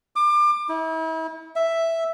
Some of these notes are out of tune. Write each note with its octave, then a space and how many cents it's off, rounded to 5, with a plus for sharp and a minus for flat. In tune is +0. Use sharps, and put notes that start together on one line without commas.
D6 +30
E4 -40
E5 +0